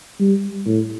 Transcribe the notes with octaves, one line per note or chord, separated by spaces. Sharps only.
G3
A2